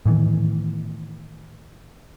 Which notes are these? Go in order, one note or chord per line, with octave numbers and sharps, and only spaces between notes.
A2 D#3 E3 B3